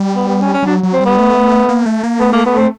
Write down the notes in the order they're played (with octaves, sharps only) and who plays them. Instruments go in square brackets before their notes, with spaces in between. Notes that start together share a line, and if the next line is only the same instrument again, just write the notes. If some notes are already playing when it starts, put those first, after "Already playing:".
Already playing: [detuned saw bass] G3
[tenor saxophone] B3
B3
C#4
C#4
[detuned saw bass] G3
[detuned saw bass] F#3 [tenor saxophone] D4
[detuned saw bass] F#3
[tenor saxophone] C4
[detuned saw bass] G3 [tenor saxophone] B3
[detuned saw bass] A3
A#3
A3
A#3
[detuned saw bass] A3 [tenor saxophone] B3
[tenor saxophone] A#3
B3
C4